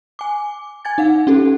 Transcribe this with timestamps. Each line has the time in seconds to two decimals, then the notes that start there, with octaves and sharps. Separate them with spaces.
0.19 G#5 D6
0.85 G#5 G#6 A6
0.98 D#4 F5 F#5
1.27 C#4 G4 A4